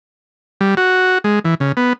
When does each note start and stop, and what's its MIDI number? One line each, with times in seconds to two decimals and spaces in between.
0.61 0.75 55
0.77 1.18 66
1.24 1.39 56
1.45 1.55 52
1.60 1.72 49
1.77 1.93 59